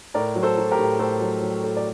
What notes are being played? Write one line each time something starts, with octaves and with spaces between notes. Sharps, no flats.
A2 A#4 D5
F#3
A4 C5
F#3
G4 A#4
A2
A2 A4 C5
F#3
F#3
A2
D5